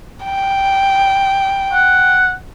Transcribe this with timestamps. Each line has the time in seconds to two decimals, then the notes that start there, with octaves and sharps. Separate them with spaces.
0.24 G5
1.73 F#5